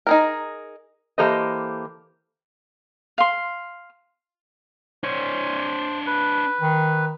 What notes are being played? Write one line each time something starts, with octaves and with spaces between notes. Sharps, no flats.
D#4 G#4 A#4
E3 A#3 G4 A4 C5 D#5
F5 C6
D4 C5 C#5
B4
D#3